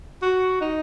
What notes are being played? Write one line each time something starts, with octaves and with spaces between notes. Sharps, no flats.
F#4
D#4